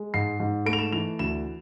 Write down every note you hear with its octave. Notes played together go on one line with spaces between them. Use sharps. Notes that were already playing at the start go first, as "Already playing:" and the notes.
Already playing: G#3
G#2 C7
G#2
A3 D7
F7
E7
E3 F7
D2 E7